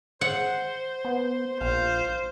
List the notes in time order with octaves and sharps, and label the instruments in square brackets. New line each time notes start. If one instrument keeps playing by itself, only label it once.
[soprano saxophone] C5 [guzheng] F#5
[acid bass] B3
[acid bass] A#1 [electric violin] C5 [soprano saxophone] F5